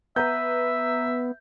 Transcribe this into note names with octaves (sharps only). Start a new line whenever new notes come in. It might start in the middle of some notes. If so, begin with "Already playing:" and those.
B3 B4 E5 A#5 G6